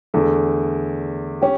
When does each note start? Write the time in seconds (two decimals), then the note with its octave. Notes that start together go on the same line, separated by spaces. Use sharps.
0.14 E2 D3 A3
1.42 C#4 G4